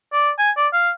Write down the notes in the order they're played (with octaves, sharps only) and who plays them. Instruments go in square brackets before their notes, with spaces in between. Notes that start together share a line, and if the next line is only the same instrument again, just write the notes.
[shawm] D5
G#5
D5
F5